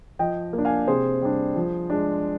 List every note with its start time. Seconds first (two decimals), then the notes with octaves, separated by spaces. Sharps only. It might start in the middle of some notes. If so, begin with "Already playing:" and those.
0.19 F3 D#5 G5
0.53 A#3
0.58 D4
0.65 F5 G#5
0.87 C3 G#4 C5
1.22 G3 D4
1.56 F3
1.90 G#3 D4